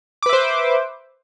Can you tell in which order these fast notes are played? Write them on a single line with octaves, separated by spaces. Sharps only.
D6 B4 E5 C5